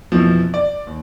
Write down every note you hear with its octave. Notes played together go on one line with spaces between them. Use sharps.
F2 B2 E3 F3
D5
D#2